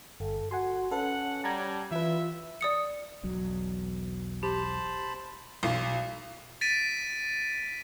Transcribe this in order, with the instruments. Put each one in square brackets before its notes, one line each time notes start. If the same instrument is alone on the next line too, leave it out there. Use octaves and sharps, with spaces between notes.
[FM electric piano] G1 [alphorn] A4
[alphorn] F#4 [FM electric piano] F#5 G#5 C6
[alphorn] C#4 [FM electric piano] A4 B4 [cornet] F#5
[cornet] G3 [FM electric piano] A5 A#5 G#6
[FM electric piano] E3 B4 [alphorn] F4 [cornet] E5
[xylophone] D5 D#6 C#7
[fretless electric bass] E1 B1 F#3
[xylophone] G4 [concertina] C5 A5 B5
[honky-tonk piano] B1
[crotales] A6 B6 D7 D#7